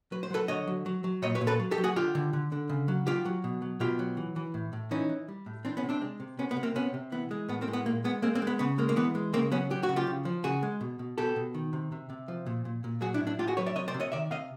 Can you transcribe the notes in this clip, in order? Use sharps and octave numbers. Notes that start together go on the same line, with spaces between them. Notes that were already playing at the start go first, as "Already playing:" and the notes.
F#3 B4
C5
F#3 A4 B4
D3 C#5 D#5
F#3
F#3
F#3
A#2 C#5 D#5
B4 C#5
A#2
A4 B4
F#3
G4 A4
F#3
F#4 G#4
D3 F4 G4
D3
D3
D3
C#3
F#3
F#3 F4 G4
F#3
B2
F#3
B2 F4 G4
F#3
E3
E3
A2
A2
E3 C#4 D#4
E3
G3
A2
E3 C4 D4
B3 C#4
C3
C4 D4
G#3
C3
C3 B3 C#4
B3
C3
A#3 C4
C3 B3 C#4
C3
E3 B3
G#3
A2 B3
A#3 C4
G#3
B3
A#2 A#3
G#3 B3
G#3 A#3 C4
A#3 C4
G#3
B3
C#3 B3
G#3 A#3
A#3
E3 B3
G#3
C#3 A#3 C4
F#3 B3 C#4
F#3 G4
F#4
C#3
F4 G4
C#3
F3
C#3 F#4 G#4
G#3
B2
B2
B2 G4 A4
B2
D#3
C3
C3
C3
F3
A#2
A#2
A#2
F#3 F#4 G#4
D4 E4
A2
D4 E4
A2 F4 G4
F#4 G#4
F#3 B4 C#5
D5 E5
C3 C#5 D#5
C5 D5
C3
C#5 D#5
D#3 D5 E5
C3 D#5 F5